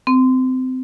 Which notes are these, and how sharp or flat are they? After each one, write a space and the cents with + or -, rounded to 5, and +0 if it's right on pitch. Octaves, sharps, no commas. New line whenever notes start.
C4 -25